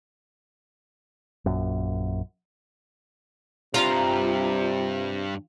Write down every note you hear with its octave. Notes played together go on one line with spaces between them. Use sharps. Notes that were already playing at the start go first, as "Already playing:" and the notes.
A#1 F#2
G2 C3 F4 A#5